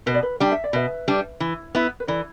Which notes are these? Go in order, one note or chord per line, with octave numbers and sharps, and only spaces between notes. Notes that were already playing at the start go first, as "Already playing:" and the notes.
B2 B4
D5
B4
G3 D4 G5
E5
D5
B2 B4 E5
G3 D4
E3
B3 E4
B4
E3 A4 D5